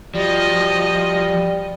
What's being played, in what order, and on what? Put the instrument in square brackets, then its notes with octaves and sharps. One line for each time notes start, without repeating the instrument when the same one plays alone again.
[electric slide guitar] F3 [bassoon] G3 [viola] F#4 D#5